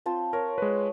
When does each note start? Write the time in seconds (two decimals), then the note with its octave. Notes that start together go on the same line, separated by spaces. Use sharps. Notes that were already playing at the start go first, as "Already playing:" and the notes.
0.06 C4 F4 A5
0.33 A#4 C#5
0.58 G#3 B4